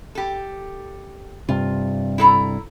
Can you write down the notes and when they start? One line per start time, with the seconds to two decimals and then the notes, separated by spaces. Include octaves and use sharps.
0.15 G4 A4
1.49 G2 C3 F4
2.18 E4 A4 A#5